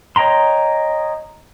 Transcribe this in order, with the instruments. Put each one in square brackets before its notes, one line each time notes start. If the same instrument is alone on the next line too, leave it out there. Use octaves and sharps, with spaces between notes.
[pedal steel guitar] C#5 D#5 G5 A#5 C6